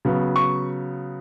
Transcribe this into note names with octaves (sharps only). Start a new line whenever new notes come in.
C#3 F#3 B3
C#6